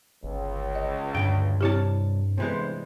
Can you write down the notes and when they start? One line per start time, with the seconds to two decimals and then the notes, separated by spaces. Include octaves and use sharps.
0.24 G1 C#2
0.75 D#5
1.15 D2 G2 A#2 G5
1.61 C2 C4 E4 G4 C#5 A5
2.38 G1 C3 E3 G#3 B3 C5